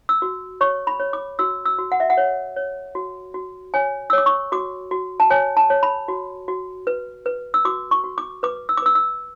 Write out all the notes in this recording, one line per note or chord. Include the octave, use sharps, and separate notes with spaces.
E6
F#4
C#5 C#6
B5
C#5
D6
F#4 E6
E6
F#4
F#5
E5
F#5
C#5
C#5
F#4
F#4
C#5 G#5
E6
C#5 D6
C#6
F#4 D6
F#4
A5
C#5 G#5
A5
C#5
B5
F#4
F#4
B4
B4
E6
F#4 D6
C#6
F#4
D6
B4 D6
E6
D6
B4 E6
E6